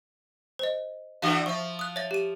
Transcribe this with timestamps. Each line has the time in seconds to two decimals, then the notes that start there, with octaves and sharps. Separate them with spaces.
0.59 C5 D#5
1.22 D3 E3 F#4 F5 D6
1.46 F3 E5 C#6
1.79 D#6 F#6
1.96 C#5 E5 A6
2.11 G4 D#7